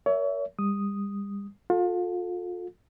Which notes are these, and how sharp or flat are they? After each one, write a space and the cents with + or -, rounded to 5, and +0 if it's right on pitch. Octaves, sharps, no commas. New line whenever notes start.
A#4 +0 C#5 +35 E5 +0
G3 +35 D#6 +0
F4 +35 A4 +0